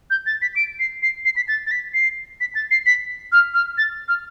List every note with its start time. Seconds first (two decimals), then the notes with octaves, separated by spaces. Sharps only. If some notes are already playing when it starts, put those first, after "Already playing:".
0.10 G6
0.26 A6
0.42 B6
0.56 D7
0.79 C7
1.02 C7
1.25 C7
1.36 B6
1.48 A6
1.66 A6
1.71 B6
1.94 C7
2.41 B6
2.55 A6
2.71 C7
2.86 B6
3.32 F6
3.54 F6
3.78 A6
4.08 F6